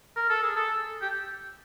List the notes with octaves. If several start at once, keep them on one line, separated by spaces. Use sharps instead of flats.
A#4
A4
G#4
A4
G4